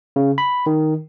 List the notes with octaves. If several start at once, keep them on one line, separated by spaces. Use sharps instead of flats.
C#3
B5
D#3